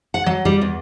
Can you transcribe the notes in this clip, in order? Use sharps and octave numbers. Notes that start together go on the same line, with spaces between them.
F#5
F#3
G3
E2